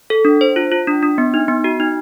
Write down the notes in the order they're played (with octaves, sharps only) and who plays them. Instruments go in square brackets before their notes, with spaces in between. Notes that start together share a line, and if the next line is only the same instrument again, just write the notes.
[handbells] A4
D4
C5
F4
F4
D4
D4
B3
D#4
B3
F#4
D#4